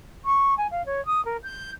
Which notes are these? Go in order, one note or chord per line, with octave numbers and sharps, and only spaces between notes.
C#6
G#5
F5
C#5
D#6
A#4
G6